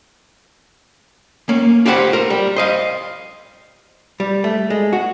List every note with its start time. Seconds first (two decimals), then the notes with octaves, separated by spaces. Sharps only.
1.49 A#3 C#4
1.86 F4 G4 B4 C5 F5 F#5
2.13 A#4 C5
2.30 G3
2.56 C5 D#5 F5
4.20 G3
4.44 A3
4.70 G#3
4.93 F#4